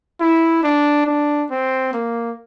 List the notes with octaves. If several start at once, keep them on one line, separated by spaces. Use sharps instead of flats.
E4
D4
D4
C4
A#3